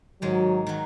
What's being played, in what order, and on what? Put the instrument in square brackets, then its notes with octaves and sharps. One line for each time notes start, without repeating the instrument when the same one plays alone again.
[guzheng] G#2 D#3 G#3 [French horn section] F#3
[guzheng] D#3 F#3